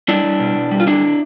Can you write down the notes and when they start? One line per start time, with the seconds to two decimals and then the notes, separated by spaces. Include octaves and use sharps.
0.08 G3 D4 E4
0.24 G3
0.40 B2
0.55 B2
0.71 G3
0.80 F4
0.87 D3 D4 E4